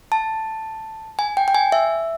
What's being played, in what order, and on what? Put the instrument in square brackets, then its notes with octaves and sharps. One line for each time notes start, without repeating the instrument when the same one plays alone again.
[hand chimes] A5
G#5
G5
G5
G#5
E5